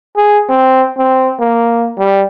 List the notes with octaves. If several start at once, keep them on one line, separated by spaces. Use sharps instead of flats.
G#4
C4
C4
A#3
G3